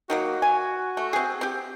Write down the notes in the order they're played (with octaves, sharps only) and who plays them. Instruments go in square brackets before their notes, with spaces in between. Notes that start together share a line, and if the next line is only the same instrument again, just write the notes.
[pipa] D#3 F#3 A#3 [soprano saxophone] F#4
[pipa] G#5
A3
C4 G#4
C4 G4